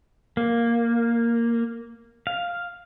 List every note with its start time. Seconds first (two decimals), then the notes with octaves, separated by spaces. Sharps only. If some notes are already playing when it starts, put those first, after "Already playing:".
0.37 A#3
2.27 F5